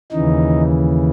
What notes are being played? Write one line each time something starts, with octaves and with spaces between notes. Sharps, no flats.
D#2 C#3 E3 D#4